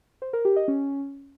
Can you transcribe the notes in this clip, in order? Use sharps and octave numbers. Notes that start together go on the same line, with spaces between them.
C5
A#4
G4
D#5
C#4